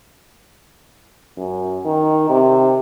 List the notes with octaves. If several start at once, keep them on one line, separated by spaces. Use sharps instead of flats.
F#2
D#3
C3